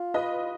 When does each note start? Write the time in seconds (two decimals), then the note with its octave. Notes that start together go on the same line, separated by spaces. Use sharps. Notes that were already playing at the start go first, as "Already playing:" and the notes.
Already playing: F4
0.14 B4 D#5